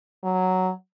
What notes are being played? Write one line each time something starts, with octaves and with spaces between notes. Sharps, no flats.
F#3